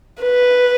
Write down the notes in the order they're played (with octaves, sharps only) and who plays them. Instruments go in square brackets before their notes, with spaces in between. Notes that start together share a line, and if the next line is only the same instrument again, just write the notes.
[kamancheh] B4